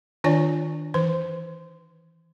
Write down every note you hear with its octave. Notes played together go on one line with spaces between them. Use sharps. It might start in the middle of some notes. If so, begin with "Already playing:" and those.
D#3 D4 F4 C#5 D5 G#5
E3 B4 C5